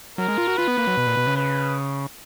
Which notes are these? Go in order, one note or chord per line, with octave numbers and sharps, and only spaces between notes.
F#3 A#4
G#3
F4
F#4
F4 B4
B3
A#3
F#3
B2
A#2
B2
C#3
B4